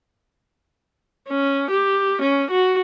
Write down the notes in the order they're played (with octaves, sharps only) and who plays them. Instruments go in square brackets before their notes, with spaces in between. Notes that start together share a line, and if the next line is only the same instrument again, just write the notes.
[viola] C#4
G4
C#4
F#4